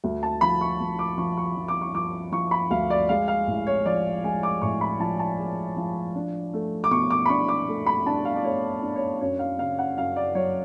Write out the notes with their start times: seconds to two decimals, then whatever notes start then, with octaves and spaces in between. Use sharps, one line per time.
0.04 D2
0.23 A5
0.41 F3 B5
0.61 C#6
0.80 D2
0.99 D6
1.17 F3 C#6
1.37 C#6
1.56 F3
1.68 D6
1.81 C#6
1.95 F3 D6
2.32 F3 C#6
2.51 B5
2.71 D2 F5
2.90 D5
3.09 G#3 F5
3.28 F5
3.47 A1
3.67 C#5
3.86 F3 D5
4.24 G#3 G#5
4.43 D6
4.62 A2 C#6
4.81 B5
5.00 F3 A5
5.19 A5
5.38 G#3
5.77 F3
6.16 D4
6.54 A3
6.84 D6
6.91 B2 C#6
7.10 D6
7.26 B5
7.29 D4 C#6
7.48 D6
7.68 A3
7.86 B5
8.06 D4 A5
8.25 F5
8.36 D5
8.44 A3 C#5
8.83 D4
8.96 C#5
9.21 F#2 C#5
9.39 F5
9.58 C#3 F5
9.78 F#5
9.97 F#2 F5
10.16 D5
10.35 F#3 C#5